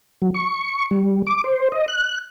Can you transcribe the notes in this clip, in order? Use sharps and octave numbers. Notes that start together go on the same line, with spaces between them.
F#3
C#6
G3
D6
C5
D#5
F#6